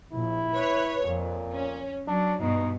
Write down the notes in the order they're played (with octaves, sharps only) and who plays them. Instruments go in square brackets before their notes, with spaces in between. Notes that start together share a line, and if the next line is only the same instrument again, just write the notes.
[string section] A#1 [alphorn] E4
[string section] B4 C#5
[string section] F2 [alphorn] A#2
[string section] C#4
[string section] F#3 [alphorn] D4
[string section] G2 B2 [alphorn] D#4